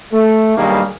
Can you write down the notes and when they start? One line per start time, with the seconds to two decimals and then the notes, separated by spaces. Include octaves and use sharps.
0.13 A3
0.57 B1 G2 D#3 G3 A#3 G#4